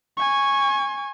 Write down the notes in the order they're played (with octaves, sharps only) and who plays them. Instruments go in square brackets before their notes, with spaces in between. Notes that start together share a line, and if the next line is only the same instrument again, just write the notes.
[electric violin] G#5 C#6